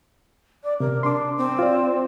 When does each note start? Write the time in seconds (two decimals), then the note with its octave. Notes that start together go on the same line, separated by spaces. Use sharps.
0.64 D5
0.80 C3 A#4
1.03 D4 C6 D6
1.38 C4
1.59 F4 D5